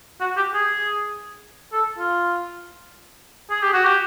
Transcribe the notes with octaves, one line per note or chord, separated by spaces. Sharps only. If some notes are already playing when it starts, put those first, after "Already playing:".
F#4
G4
G#4
A4
F4
G#4
G4
F#4
G4